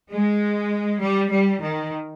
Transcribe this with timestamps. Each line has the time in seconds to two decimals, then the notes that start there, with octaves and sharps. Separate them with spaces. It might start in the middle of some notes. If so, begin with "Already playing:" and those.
0.10 G#3
1.00 G3
1.30 G3
1.60 D#3